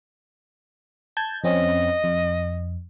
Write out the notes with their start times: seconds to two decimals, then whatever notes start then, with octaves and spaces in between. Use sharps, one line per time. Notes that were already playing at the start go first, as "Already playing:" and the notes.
1.17 A5 G6 G#6
1.44 F2 C4 C#4 D#5
2.04 F2